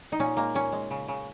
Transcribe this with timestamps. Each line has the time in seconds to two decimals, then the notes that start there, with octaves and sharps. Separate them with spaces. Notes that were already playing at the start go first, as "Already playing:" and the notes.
0.12 D#4
0.20 A#2 C#4
0.37 G#3 A#3
0.55 A#2 C#4
0.72 G#3
0.91 C#3
1.08 C#3